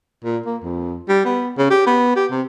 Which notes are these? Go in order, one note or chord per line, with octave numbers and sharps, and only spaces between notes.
A#2
A#3
F2
G3
B3
C#3
G4
B3
G4
C3